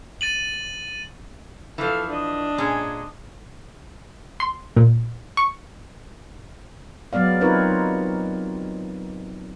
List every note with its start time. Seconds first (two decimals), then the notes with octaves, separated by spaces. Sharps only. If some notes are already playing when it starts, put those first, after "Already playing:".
0.21 A6 D#7 F#7
1.78 E3 F3 A4 F5
2.08 D4 D#5
2.58 A#2 G#3 C#4
4.40 C6
4.77 A#2
5.37 C#6
7.13 F#3 G#3 B3 D5 F5
7.41 C4 D#4 F4 A#4 B4 C#5